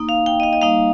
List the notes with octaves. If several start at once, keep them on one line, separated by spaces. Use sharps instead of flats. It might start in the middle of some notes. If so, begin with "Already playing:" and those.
Already playing: A#3 D#4
F5
G5
D#5
F5
D#5
G3 A#3 D#4 F5